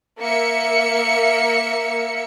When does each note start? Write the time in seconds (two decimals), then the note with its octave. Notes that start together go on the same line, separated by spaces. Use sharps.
0.20 A#3 E5 C#7